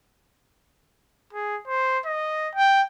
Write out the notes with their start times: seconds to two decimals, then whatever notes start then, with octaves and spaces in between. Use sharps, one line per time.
1.33 G#4
1.68 C5
2.06 D#5
2.55 G5